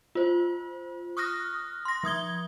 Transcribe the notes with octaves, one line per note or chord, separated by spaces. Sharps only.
F4 C5
C#6 D#6 F6 F#6 A#6
C6 A#6
F3 D#6 G#6 G7